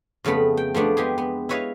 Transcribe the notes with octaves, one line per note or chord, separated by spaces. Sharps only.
F2 C#3 A3 B3 B5
G5
F3 A3 B3 D4
G#3 B3 G4 G#4
B3
E4 B4 C#5 D#5 F5